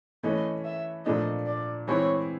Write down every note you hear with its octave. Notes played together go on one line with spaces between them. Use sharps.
E3 A3 C#4 E4 D#5
E5
A#2 F3 A3 D4 D#5
D5
E3 G#3 C4 E4 C#5